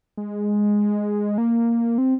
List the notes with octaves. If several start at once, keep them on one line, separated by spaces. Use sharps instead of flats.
G#3
A#3
C4